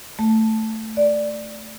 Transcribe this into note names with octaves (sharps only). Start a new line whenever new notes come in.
A3
D5